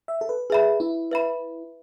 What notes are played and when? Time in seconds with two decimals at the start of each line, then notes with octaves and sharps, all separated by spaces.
0.08 E5
0.21 A4
0.29 B4
0.50 G#4 B4 E5 B5
0.80 E4
1.11 B4 E5 B5